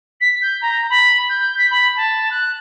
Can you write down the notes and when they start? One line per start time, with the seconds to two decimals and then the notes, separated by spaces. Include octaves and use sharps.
0.20 B6
0.41 G6
0.61 A#5
0.89 B5
1.29 G6
1.58 B6
1.70 B5
1.96 A5
2.31 F#6